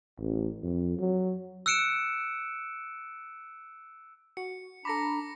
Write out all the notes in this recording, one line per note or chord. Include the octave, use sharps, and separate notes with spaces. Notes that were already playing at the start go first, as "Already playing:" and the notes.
A1
F2
F#3
E6 F#6 C#7 D7 E7
F#4 C#7
D4 A4 A#5 B5 D6 A#6 C#7